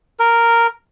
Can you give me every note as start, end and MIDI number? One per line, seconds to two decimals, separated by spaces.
0.19 0.67 70